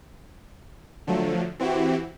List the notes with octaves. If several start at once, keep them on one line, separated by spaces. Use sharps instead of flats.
D3 F3 F#3 A3
E3 C4 E4 F#4 G4